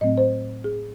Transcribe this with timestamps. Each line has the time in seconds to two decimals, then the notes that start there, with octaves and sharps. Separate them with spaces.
0.01 A2 F#3 A3 C4 D#5
0.18 C5
0.64 G#4